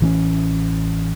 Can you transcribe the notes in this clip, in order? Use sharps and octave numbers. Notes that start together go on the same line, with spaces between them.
A1 E3 C4 C#4